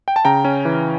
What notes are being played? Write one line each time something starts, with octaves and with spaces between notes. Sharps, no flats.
G5
A5
C#3 G5 A#5
C#4
E3